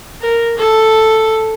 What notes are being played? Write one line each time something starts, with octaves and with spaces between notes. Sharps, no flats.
A#4
A4